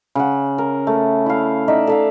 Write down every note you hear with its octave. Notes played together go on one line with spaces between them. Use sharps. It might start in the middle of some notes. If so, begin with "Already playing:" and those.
C#3 F#5
A#4
A3
E4 F5
D#4 D5 E5
A4 E5 F5